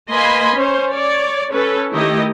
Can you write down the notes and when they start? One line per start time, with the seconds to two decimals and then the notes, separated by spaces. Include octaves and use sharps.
0.10 A#3 B4 D#5 G#5 B5 C6
0.56 C#4 C5
0.92 C#5 D5
1.51 C#4 A4 B4
1.92 D#3 A3 E4 G4 D#5